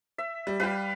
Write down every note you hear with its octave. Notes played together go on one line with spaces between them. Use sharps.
E5
G3
G3 G4 B4 F5